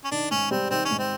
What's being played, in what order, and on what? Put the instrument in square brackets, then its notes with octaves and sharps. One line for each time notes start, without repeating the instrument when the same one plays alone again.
[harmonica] C#4
[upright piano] D#3 [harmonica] D4
[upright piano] G#2 [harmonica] C#4
[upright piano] G3 [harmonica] C4
[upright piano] D#3 [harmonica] C4
[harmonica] C#4
[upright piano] G#2
[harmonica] C4